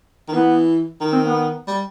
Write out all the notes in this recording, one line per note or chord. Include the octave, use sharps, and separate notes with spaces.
D#3
E3 B3
D#3
C4
B3
G3